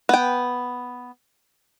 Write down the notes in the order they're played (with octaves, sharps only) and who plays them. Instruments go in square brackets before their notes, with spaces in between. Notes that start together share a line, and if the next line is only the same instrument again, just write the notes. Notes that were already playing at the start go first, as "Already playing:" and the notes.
[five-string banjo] B3 G5